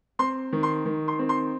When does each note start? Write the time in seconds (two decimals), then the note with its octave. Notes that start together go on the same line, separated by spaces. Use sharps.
0.19 C4 C6
0.53 D#3
0.63 C6
0.86 D#3
1.08 C6
1.19 C4
1.29 C6